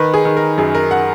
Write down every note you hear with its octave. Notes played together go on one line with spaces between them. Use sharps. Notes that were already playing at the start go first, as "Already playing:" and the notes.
Already playing: D#3 B4
G#4
D#3
A#4
F#2 G#4
A#4
F#5